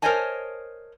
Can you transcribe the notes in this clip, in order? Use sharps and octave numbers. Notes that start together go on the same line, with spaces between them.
A#4 C5 C#5 D#5 G#5 A5